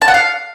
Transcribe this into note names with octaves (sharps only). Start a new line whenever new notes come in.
A5
F#5
F5